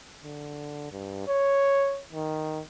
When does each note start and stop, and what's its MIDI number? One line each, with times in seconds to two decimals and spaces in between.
0.24 0.91 50
0.92 1.24 43
1.28 2.00 73
2.13 2.61 51